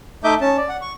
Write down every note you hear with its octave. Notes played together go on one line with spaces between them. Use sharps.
A3 D#4 D#5 E5 D6 G6
C#4 A5
D5
F#5
C#6